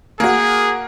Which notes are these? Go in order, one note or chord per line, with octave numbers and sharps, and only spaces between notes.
A#3 F#4 G#4